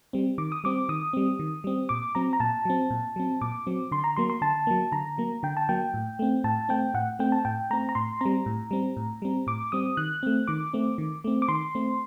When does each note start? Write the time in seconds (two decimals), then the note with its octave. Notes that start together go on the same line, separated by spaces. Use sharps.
0.13 G3 C4
0.38 D#3 D6
0.52 D#6
0.64 G3 C4 D6
0.89 D#3 D#6
1.13 G3 C4
1.39 D#3
1.64 G3 C4
1.89 A#2 D6
2.15 F#3 C4 A#5
2.33 A#5
2.40 A#2 A5
2.65 F#3 C4
2.90 A#2
3.16 F#3 C4
3.41 A#2 D6
3.67 F#3 C4
3.92 D3 C6
4.04 A#5
4.16 F#3 A#3 C6
4.30 C6
4.42 D3 A5
4.67 F#3 A#3
4.92 D3 A#5
5.18 F#3 A#3
5.43 D3 G5
5.57 A5
5.69 F#3 A#3 G5
5.94 A2
6.19 A3 C4
6.44 A2 A5
6.69 A3 C4 G5
6.94 A2 F#5
7.19 A3 C4 G5
7.32 A5
7.45 A2 G5
7.71 A3 C4 A#5
7.89 A#5
7.95 A2 C6
8.21 G3 C4 A#5
8.46 A2
8.71 G3 C4
8.97 A2
9.22 G3 C4
9.47 A2 D6
9.72 G3 C4 D#6
9.97 D#3 F#6
10.23 A3 C4
10.47 D#3 D6
10.73 A3 C4
10.98 D#3
11.24 A3 C4
11.42 D6
11.48 D#3 C6
11.75 A3 C4